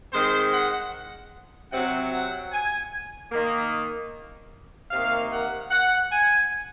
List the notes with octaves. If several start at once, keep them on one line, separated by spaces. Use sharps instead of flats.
D#3 G#3 C4 C5
F#5
C3 F#3 C4 F#5
F#5
G#5
D#3 A#3
C3 D#3 A#3 F5
F#5
F#5
G#5